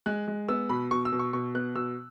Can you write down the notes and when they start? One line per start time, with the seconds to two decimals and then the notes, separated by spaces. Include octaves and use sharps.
0.06 G#3 F#6
0.28 G#3
0.48 B3 E6
0.69 B2 B5
0.91 B2 C#6
1.05 E6
1.12 B2
1.19 C#6
1.33 B2 C#6
1.55 B3 F#6
1.75 B2 E6